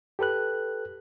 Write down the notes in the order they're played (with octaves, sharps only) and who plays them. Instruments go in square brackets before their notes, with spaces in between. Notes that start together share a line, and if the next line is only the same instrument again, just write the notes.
[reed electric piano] G4 A4 B4 F#6